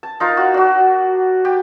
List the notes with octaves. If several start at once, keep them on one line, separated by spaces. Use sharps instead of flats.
A5
D#4 F4 A#4
F#4
D4 F#4
G4